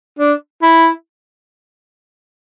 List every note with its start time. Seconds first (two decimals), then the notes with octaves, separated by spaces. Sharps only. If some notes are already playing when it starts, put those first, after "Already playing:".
0.19 D4
0.62 E4